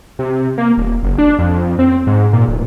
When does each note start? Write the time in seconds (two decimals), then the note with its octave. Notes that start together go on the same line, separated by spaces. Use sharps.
0.19 C3
0.58 A#3
0.77 D#1
1.03 F#1
1.18 D4
1.39 F2
1.79 C4
2.07 G#2
2.33 A#2
2.48 D1